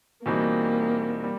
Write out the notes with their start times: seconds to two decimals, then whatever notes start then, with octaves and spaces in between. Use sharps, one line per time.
0.25 E2 B2 G3 A#3 C4 D#4
1.24 G3